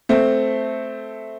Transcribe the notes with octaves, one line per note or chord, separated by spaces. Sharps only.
A3 C4